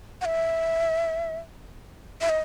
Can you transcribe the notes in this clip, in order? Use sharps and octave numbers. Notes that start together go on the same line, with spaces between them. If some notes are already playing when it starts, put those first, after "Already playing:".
F#5
E5
E5
D#5